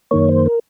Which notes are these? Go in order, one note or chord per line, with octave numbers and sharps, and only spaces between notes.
F#2 D#3 A#3 C#5
C5
A#4